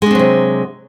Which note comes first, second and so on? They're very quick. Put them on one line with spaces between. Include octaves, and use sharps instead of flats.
G#3 D4 C4 F#3 C3